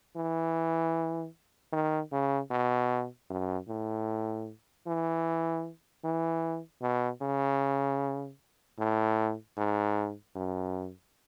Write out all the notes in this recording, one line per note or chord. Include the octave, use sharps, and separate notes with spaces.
E3
D#3
C#3
B2
F#2
A2
E3
E3
B2
C#3
A2
G#2
F#2